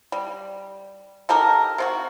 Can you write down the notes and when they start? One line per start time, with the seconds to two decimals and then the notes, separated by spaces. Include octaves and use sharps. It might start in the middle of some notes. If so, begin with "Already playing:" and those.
0.12 G3
1.29 D#4 G4 A4 A#4
1.78 C3 F4 F#4